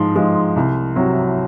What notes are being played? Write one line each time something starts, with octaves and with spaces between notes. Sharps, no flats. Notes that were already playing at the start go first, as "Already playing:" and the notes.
Already playing: G#2 F3 G#3 C6
F3 G#3
C2
C3 F#3